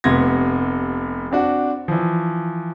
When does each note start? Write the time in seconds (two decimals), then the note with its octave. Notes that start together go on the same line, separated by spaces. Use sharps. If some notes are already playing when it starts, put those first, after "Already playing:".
0.04 F1 C3 B3 C6 G#6 A#6
1.31 C4 D4 F#4
1.88 E3 F3